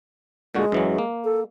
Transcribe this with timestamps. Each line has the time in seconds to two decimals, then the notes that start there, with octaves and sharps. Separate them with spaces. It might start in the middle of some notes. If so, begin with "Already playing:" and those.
0.55 A#2 D3 G#3 F#4
0.72 F#2 E3 F#3
0.98 A#3
1.24 A4